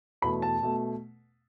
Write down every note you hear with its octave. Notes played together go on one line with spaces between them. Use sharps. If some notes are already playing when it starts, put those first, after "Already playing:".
E2 B2 A3 B5
A5
B2 A3